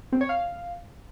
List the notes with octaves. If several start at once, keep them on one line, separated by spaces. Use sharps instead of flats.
C4
C#5
F5